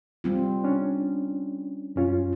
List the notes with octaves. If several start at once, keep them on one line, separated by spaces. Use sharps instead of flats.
G3 C4 F4
C#4 D4
F#2 C#4 F4